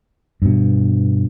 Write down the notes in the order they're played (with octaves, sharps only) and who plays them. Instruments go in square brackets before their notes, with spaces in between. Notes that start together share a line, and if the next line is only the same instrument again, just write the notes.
[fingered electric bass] G2 B2